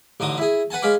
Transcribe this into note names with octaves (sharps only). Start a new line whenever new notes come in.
A1 D3 D#4 D#6
E4 G#4
B4 F#5 G#5 A5
G#3 C#4 F5 B5 D6